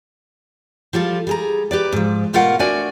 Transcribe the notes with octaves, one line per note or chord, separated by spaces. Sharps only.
F3 G3 F4 A4
G3 G#4 A#5
G4 B4 D5
G#2 F3
B2 A3 F4 A#4 F5 F#5
A3 D4 F#4 A#4 D5 G#5